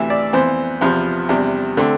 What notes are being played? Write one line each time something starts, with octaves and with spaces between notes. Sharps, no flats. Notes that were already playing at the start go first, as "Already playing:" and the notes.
Already playing: D2 C3 E3 E5
D5
F2 E3 B3 C5
E2 C3 F3 B3
E2 C3 G3 D4
D3 A3 C4